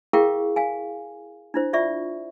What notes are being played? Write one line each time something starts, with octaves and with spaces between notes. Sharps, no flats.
E4 G#4 A#4 F5 G5 C#6
F5 G#5
D4 E4 C5
F4 D5 E5 C#6